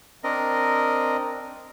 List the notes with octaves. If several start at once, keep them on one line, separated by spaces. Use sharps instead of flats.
C4 D4 A#4 D#5